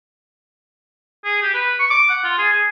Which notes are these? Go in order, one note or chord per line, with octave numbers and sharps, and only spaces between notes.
G#4
G4
B4
C#6
D6
F#5
F4
G#4
G#4